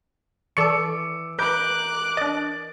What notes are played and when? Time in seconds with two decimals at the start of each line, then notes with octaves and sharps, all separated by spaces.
0.57 E3 A4 D5 C#6 D6 E6 C#7
1.39 A#4 B4 A#5 D6 F#6 G6
2.17 D4 D#5 A6